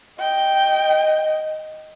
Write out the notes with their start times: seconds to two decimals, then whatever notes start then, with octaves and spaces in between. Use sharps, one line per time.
0.19 D#5 G5